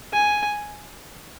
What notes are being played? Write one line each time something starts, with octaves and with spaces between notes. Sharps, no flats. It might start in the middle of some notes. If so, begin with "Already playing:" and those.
G#5